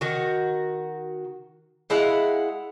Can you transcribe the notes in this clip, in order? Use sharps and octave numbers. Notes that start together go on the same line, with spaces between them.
D#3 F#4
G#3 E4 F5 F#5